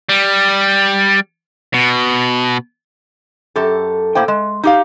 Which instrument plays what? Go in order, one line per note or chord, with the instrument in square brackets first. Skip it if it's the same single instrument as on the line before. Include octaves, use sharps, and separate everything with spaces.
[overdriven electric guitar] G3
B2
[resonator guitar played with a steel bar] F#2 G4 A4
A2 A#3 C5 G5
G#3
D#4 G4 F5